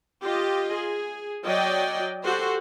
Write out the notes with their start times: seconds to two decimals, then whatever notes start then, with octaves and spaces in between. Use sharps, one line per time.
0.23 F4 G4 D#5
0.75 G#4
1.45 F#3 D5 D#5 G5
2.24 F#4 G4 A4 C5